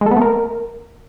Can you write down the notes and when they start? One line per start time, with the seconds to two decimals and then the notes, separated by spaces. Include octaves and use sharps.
0.01 G#3
0.06 A4
0.11 B3
0.16 A3
0.21 A#4